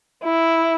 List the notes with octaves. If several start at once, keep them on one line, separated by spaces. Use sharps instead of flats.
E4